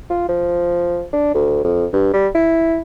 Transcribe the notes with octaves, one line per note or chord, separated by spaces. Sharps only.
F4
F3
D4
D2
F2
G2
G3
E4